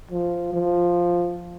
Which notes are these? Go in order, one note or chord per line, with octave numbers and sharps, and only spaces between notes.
F3
F3